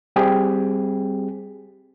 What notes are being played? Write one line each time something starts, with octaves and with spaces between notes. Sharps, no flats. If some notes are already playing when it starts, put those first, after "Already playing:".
G3 C4 G4 G#4